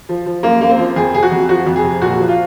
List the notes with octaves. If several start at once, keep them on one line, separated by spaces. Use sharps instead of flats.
F3
F3
F#2 A#3
F#2 A#3
C4
F3
F2 G#4
C3 G#4
F#4
F2
F3 F#4
F2
G#4
C3
A#2 F#4
F3
F4